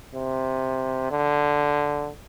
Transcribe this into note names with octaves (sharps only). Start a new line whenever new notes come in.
C3
D3